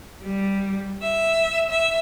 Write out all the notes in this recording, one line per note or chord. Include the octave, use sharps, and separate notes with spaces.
G3
E5
E5